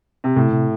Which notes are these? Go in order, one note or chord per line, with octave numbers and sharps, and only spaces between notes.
C3
A2 C3
C3